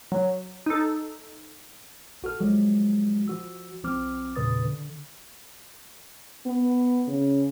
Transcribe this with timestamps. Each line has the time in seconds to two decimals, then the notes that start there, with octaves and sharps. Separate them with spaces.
0.12 F#3
0.66 D#4 A4
2.23 A#1 F#4 A4 F6
2.40 F3 F#3 G#3 F#4
3.28 F3 F#4 E6
3.83 B1 F3 C4 D6 F6
4.36 E2 A#2 C#3 B4 D#6 A6
4.65 D3
6.46 B3
7.08 C#3